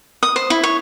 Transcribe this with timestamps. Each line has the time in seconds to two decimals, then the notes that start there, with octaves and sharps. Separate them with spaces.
0.23 D#6
0.36 C5
0.50 E4
0.63 C#5